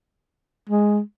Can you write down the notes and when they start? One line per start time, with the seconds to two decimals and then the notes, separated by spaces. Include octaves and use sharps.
0.70 G#3